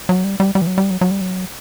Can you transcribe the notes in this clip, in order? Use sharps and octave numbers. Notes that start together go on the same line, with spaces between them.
F#3
G3
G3
G3
E3
F#3
G3
F#3
F#3
G3
F#3